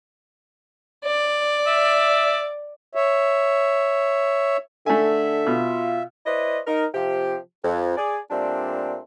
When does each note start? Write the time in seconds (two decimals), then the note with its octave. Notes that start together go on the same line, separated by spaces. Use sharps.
1.05 D5
1.67 E5
2.95 C#5 E5
4.86 D3 A3 E5 G#5
5.47 B2 F4
6.26 E4 B4 C5 D5 D#5
6.67 D#4 A#4
6.94 C3 F3 G4
7.64 F2
7.97 G#4 D5
8.30 A#2 G3 A3 C4 D4